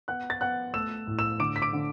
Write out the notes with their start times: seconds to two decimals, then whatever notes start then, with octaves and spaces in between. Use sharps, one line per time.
0.08 B3 F#5 F#6
0.30 A6
0.41 B3 F#5 F#6
0.74 A3 E6 E7
1.07 A2
1.19 E6 E7
1.40 D3 D6 D7
1.56 B6
1.62 D6 D7
1.73 D3